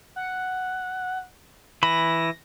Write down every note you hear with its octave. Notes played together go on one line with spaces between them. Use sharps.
F#5
E3 B5 A#6